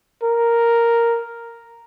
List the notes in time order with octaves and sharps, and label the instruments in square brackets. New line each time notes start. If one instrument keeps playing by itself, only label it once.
[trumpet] A#4